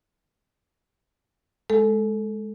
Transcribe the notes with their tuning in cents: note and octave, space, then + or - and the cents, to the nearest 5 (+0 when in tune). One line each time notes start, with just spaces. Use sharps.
G#3 +15 A4 +0